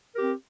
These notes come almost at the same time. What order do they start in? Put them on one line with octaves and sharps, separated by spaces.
A#4 G4 C4